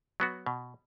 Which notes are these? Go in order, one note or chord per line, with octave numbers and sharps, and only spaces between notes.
F#3 B3 F#4
B2